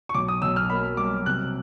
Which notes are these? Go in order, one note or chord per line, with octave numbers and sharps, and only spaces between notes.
C#6
B1 D6
D#6
B1 E6
F6
A#3 B5
G3 D6
C3 F#6